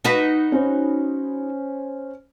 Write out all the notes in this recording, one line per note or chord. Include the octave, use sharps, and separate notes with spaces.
D#4 F#4 B4
C#4 C5